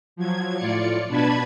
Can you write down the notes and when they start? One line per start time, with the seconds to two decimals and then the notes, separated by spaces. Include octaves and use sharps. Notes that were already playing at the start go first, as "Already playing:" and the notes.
0.16 F3 F#3 G#6
0.56 A2 F4 D5 C#7
1.08 B2 D4 B4 A5 B5 G#6